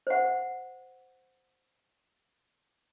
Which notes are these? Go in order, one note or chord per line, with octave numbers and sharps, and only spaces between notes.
C5 F#5